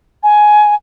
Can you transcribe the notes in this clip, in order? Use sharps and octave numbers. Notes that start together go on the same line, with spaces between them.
G#5